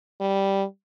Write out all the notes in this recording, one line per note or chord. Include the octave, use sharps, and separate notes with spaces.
G3